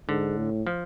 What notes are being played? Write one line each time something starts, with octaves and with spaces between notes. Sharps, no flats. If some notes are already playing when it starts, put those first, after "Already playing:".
G#2 D3
A2
F3